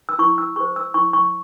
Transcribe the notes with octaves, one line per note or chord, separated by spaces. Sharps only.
E6
E4 C#6
E6
G#4 C5 C#6
E6
E4 C#6
C#6